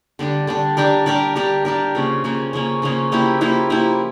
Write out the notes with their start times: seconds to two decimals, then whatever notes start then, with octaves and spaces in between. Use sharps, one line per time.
0.19 D3 G3 D4
0.47 D3 G3 D4
0.77 G3 D4 G4 A#4
1.06 G3 D4 G4 A#4
1.36 G3 D4 G4 A#4
1.65 G3 D4 G4 A#4
1.95 C#3 F3 A#3 C#4
2.24 C#3 F3 A#3 C#4
2.53 C#3 F3 A#3 C#4
2.82 C#3 F3 A#3 C#4
3.12 F3 A#3 E4 G4
3.41 F3 A#3 E4 G4
3.70 F3 A#3 E4 G4